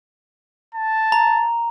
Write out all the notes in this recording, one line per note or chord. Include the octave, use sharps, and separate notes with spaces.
A5
A#5